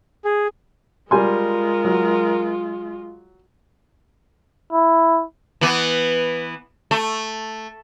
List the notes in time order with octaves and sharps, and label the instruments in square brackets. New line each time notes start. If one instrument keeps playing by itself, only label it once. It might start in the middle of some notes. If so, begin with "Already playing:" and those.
[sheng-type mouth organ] G#4
[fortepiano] G3 G#5 C6 [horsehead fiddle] G#3 F4 [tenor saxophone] A#4
[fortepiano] F#3
[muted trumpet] E4
[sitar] E3 B3
A3